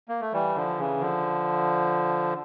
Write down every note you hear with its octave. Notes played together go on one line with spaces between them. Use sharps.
A#3
A3
E3 G3
D3 F3
C#3 E3
D3 F3